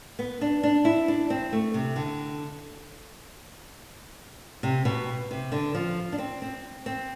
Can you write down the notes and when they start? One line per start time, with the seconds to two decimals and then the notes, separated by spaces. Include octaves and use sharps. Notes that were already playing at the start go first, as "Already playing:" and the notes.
0.19 B3
0.41 D4
0.63 D4
0.85 E4
1.08 D4
1.30 C4
1.52 A3
1.74 C3
1.96 D3
4.63 C3
4.85 B2
5.31 C3
5.52 D3
5.74 F3
6.12 D4
6.18 C4
6.42 C4
6.86 C4